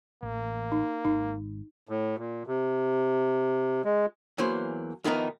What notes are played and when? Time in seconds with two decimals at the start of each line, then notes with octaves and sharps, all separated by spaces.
0.23 A1 A#3
0.72 D#4
1.05 G#1 D#4
1.89 A2
2.18 A#2
2.47 C3
3.85 G#3
4.38 E2 E3 F#3 A#3 C5
5.04 F2 D#3 E3 B3 D#4 A#4